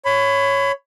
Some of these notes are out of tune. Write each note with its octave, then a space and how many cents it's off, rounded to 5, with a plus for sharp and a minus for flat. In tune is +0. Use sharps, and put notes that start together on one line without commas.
C#5 +0 B5 +25